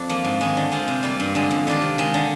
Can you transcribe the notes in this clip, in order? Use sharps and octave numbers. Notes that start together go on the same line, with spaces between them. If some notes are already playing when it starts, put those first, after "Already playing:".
Already playing: F2 D4
F3 A#3
G#2
D#3 G#3
D3
G#3 C4 F4
C3
G3 A#3 F4
G2
D3 G#3
F2
D#3 G3 D4 F4
C3
D#3 G#3
D3